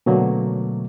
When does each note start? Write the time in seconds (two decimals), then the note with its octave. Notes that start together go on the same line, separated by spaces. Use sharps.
0.06 B2 D3 F#3 A3 A#3